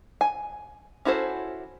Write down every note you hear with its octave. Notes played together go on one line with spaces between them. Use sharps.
G#5
C#4 E4 F#4 A4 C5